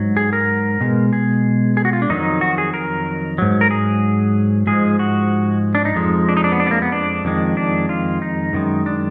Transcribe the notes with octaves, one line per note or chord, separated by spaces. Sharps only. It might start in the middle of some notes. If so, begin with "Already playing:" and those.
Already playing: G#2 F#3
G#4
A#4
B2 G#3
G#4
G#4
F#4
F4
D4
F2 D#3 F#3 D#4
F#4
G#4
A#4
G#2 F#3
A#4
G#4
G#2 F3 G#3 G#4
F#4
D4
D#4
F2 F3 G#3
D4
D#4
D4
B3
D4
B3
A#3
B3
D4
F2 D#3 G#3
D4
F4
D#4
F#2 D#3 G#3
D4